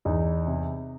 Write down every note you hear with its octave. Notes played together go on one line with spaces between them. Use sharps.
E2 D#4
C3